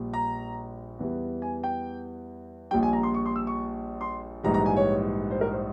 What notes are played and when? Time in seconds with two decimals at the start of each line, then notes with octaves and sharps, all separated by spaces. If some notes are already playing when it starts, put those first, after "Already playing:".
Already playing: A#1 A#2 G3
0.14 A#5
0.99 E2 E3 G3
1.42 G#5
1.64 G5
2.71 A#1 A#2 G3 G5
2.83 G#5
2.93 A#5
3.03 C6
3.14 C#6
3.26 C6
3.36 E6
3.47 C#6
4.01 C6
4.44 A#1 G#2 E3 G3 A#5
4.54 A#5
4.66 G#5
4.76 C#5
5.31 C5
5.41 A#4
5.52 C5